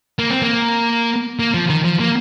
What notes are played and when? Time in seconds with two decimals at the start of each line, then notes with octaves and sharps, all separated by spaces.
0.19 A#3
0.30 C4
0.42 A#3
1.39 A#3
1.54 F3
1.70 D#3
1.84 F3
2.00 A#3